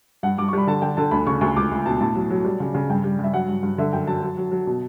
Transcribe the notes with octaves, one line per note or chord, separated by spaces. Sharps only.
G2 F#5
G2 D6
C#6
G3 B5
D3 A5
D3 G5
D3 A5
D2 B5
C#3 C#6
D2 C#6
C#2 D6
C#2
B2 A5
A2 A5
F#3
F#3
G3
C#3
C#3
G2 G5
G3
G2
E5
F#3 F#5
G2
G2
D3 E5
F#2 G5
F#3 A5
F#3
F#3
F#3
B2